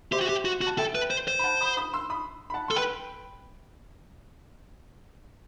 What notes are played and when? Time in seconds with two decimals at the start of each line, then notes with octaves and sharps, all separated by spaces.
0.12 G4 C5 E5
0.21 F#4
0.29 G4
0.45 F#4
0.61 F#4
0.67 A5
0.78 A4 E5 G5
0.95 B4
1.11 C5
1.28 C5
1.39 B5
1.44 F#5 A5
1.61 B5 D#6
1.77 B5 D#6
1.93 C6 E6
2.10 B5 D#6
2.50 B5
2.54 F#5 A5
2.68 A4 C6
2.76 B4 G5 B5